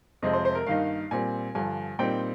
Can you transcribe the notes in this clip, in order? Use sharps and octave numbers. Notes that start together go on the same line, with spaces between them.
F2 C3 F3 G#3 C4 D#5
C5
C5
A#4
G2 D#3 A#3 D#4 F5
A#2 G3 C4 G#5
G2 D3 F3 G#5
A#2 G3 C4 D#4 G5